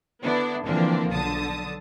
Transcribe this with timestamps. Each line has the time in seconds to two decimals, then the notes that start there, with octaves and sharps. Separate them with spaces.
0.22 D3 B3 D4 E4
0.65 D3 E3 F3 A#3 C4 D4
1.10 B1 D3 A5 D#6